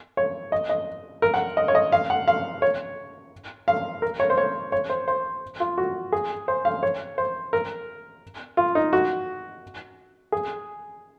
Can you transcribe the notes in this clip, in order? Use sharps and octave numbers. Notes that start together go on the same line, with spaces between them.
C#5
D#5
D#5
A#4
F#5
D#5
C#5
D#5
F5
F#5
F5
C#5
F5
A#4
C#5
C5
C#5
C#5
C5
C5
F4
F#4
G#4
C5
F5
C#5
C5
A#4
F4
D#4
F#4
G#4